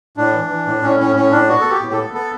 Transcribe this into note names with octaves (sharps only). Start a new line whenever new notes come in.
A2 D4
E3
E3
A2
A2 C#4
A2 C#4
A2 C#4
A2 D4
B3 F#4
B3 A4
G4
A2
B3 A4
B3 A4